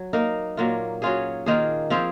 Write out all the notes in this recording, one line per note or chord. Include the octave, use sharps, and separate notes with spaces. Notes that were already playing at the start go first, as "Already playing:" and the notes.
Already playing: F#3
A#3 D#4 A#4
A#2 F#3 A#3 F4
F#3 C#4 F4 G#4
D#3 A#3 F4 G#4
F3 C4 F4 G#4